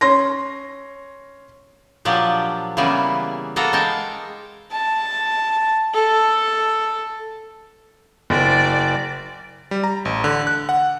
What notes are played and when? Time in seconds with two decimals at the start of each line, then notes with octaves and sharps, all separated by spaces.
0.01 C#4 C6 A#6
2.05 A#2 F3 F#3 D4 G4
2.77 C#3 E3 G3 A#3 B3 E4
3.56 A#3 B3 A4 F#5 A#5
3.73 G#3 A#4 G5 A5
4.72 A5
5.94 A4
8.30 F#1 D5
9.71 G3
9.84 A#5
10.05 A1
10.24 D3
10.47 F#6
10.69 F#5